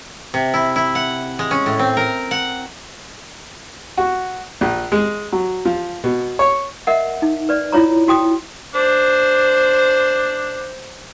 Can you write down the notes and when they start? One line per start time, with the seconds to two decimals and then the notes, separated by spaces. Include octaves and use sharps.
0.34 C3
0.54 E4
0.76 E4
0.95 F#5
1.39 G#3
1.51 C#4
1.66 A2
1.79 C4
1.97 A#4
2.31 F#5
3.98 F#4
4.61 A#1
4.92 G#3
5.32 F#3
5.65 F3
6.04 B2
6.39 C#5
6.87 A#4 D#5 E5 F#5
7.22 D#4
7.49 B4 D5
7.72 E4 F4 C#5 A#5
8.07 E4 F#4 G5 D#6
8.75 D4 C5